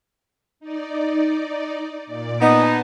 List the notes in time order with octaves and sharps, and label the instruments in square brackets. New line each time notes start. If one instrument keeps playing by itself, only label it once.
[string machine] D#4 D5
A#2 D5
[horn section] B3 D#4 [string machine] G#5 A5